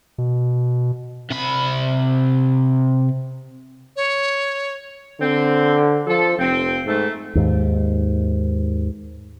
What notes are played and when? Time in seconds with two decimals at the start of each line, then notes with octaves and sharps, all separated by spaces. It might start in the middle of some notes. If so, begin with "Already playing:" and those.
0.18 B2
1.31 C3 B5
3.96 C#5
5.20 D3 C4
6.07 F3 A4
6.39 F1 C4
6.85 G#2 A3
7.35 D#2 G#2